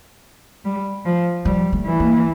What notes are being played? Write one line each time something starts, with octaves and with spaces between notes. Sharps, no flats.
G3
F3
F3 G3
A3
E3
A#3